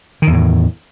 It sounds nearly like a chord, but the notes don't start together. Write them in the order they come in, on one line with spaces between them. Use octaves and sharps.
D#3 E2 A2